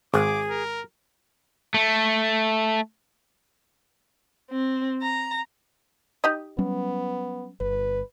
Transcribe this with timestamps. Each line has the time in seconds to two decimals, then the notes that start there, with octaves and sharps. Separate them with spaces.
0.14 G#1 G#4 D6
0.49 A#4
1.74 A3
4.51 C4
5.02 A#5
6.24 D#4 G4 D#5
6.58 F#3 G3 B3 C#4
7.60 G1 B4